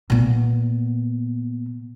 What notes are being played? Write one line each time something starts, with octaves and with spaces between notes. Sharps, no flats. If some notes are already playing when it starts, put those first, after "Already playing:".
A#2 B3